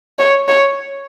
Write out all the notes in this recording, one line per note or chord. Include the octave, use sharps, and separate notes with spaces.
C#5
C#5